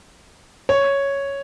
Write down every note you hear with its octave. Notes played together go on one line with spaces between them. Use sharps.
C#5